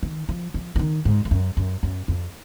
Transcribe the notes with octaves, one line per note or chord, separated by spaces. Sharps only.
D#3
F3
F3
F3
D#3
G#2
F2
F#2
F#2
F#2
F2